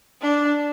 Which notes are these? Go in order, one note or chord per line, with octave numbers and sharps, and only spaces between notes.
D4